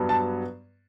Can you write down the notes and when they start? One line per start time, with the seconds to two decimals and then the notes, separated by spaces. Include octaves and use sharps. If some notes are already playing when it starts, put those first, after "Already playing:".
Already playing: G2 F#3 B3
0.09 A5